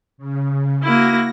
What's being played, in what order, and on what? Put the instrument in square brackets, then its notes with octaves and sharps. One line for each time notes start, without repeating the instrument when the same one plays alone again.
[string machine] C#3
[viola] A#3 E4 [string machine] F#4 A#6